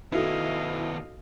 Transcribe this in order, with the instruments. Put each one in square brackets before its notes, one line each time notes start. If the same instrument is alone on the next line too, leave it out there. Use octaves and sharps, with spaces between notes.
[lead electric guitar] D#3 B3 [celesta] D#4 F#4 A4 [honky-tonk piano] E4 [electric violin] D#5 F5